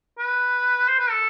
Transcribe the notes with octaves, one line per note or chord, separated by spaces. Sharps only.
B4
C5
B4
A4